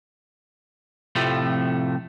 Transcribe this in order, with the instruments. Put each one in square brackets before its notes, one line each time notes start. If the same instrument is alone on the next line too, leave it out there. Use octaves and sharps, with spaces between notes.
[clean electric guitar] F2 A2 C3 F3 A3